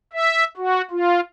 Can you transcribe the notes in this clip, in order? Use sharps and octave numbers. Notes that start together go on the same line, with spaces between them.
E5
F#4
F4